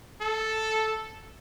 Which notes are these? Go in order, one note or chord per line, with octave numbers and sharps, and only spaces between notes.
A4